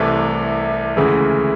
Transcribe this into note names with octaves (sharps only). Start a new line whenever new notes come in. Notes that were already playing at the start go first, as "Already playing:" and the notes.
Already playing: C2 C3 E3 A3
D2 C#3 E3 G#3